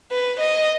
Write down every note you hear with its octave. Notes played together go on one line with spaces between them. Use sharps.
B4
D#5